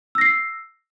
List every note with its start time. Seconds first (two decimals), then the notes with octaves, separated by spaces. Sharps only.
0.15 E6
0.18 A#6
0.21 C7